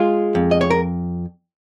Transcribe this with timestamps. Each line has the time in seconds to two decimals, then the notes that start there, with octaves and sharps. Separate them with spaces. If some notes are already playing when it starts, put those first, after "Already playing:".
Already playing: G#3 F4
0.35 F2
0.51 D#5
0.61 C#5
0.70 A#4